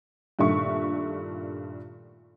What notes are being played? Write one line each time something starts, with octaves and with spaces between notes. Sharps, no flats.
G2 A#2 D#3 A3 E5 C#6